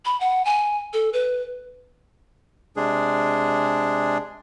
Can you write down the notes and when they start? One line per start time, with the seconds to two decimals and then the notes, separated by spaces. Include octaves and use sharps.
0.05 B5
0.20 F#5
0.45 G#5
0.93 A4
1.13 B4
2.77 C3 G#3 D4 G#4